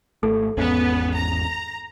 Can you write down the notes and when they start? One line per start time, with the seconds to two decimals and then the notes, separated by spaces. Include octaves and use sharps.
0.23 G#1 A3 A4
0.57 G#1 E2 B3 C#4
1.13 A#5